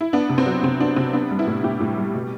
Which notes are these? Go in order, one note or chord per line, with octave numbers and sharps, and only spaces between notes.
E4
B3 D4
C3
C4
F#3
C3 C4
B3 D4
C3 C4
B3 D4
G3
E4
A2
A2 G4
A2
G3
B2